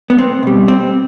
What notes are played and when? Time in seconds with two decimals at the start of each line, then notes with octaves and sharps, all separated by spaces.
0.10 B3
0.18 C4
0.43 B2 G3
0.68 C4